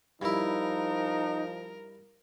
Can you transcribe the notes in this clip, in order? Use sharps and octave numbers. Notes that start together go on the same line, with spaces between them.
G2 F3 D#4 E4 A#4